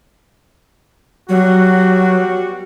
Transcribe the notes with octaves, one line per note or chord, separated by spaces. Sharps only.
F#3 G3 B3 F#4